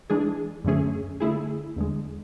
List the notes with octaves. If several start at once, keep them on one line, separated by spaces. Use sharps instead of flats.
E3 G#3 D4 G#4
F#2 D3 A3 C#4 G#4
D3 A3 E4 G#4
E2 D3 G#3